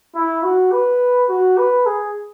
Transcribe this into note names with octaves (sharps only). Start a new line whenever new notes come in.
E4
F#4
B4
F#4
B4
G#4